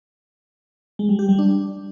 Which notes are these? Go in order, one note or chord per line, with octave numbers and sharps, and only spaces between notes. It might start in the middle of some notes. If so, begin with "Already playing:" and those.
G#3
G3
G4
G3
D4